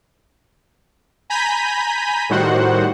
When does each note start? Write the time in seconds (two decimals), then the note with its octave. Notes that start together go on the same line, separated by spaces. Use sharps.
1.30 G#5 A#5 B5 G6 B6 D#7
2.29 A2 D#3 G3 F#4 C5 F#5